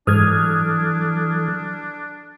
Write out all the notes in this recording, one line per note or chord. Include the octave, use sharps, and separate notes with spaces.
G#2 E3 F#3 D4 A4 D#6 F6 G#6